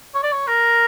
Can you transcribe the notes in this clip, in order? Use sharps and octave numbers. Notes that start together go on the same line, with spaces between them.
C#5
D5
C#5
A#4